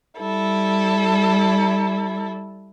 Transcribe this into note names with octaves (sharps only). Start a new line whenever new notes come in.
G3 E4 A4